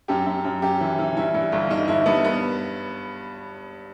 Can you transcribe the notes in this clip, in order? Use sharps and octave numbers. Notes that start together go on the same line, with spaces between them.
F#2 G4
F#2
F#2
F#2 G4
E3
E3
G2 E4
G2
G1
G1 D#4
G1 E4
G2 B3
B3